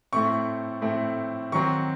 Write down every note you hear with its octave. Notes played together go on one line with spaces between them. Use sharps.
A2 A3 C4 C#6
A2 A3 C4
D#3 F#3 C4 C#6